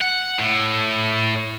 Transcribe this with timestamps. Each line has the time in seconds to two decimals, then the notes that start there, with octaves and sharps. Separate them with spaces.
0.01 F#5
0.39 A2